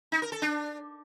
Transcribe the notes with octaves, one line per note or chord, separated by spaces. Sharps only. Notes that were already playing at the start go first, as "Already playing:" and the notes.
D#4
A#4
A4
D4